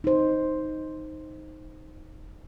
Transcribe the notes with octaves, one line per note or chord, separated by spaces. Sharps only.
D#4 C5